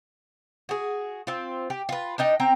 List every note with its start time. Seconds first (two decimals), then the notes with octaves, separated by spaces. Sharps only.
0.69 F#4 G#4
1.27 C4 F4
1.70 G4
1.89 F4 B4
2.18 D4 D#4 D#5 G5
2.40 C4 G5 A#5